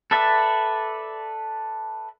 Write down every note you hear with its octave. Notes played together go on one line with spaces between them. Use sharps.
A4 B4 D5 E5